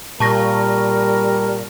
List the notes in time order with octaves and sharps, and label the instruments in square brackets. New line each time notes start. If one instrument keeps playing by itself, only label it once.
[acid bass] A#2 [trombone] G3 [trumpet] A#4 [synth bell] A5 C#6 A#6